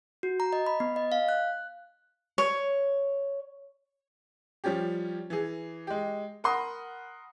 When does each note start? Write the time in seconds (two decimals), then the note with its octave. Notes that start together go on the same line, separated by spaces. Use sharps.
0.23 F#4
0.40 A#5
0.53 D#5
0.67 B5
0.80 B3
0.96 D#5
1.12 F5
1.29 F#6
2.38 C#5
4.64 F3 G3 C#4 G4
5.30 E3 G#4
5.87 G#3 G4
6.44 A#4 F#5 B5 C6 D#6